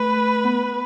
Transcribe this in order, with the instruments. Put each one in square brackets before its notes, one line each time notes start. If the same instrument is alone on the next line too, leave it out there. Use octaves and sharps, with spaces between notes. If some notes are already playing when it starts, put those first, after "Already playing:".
Already playing: [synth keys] A3 [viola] B4
[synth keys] B3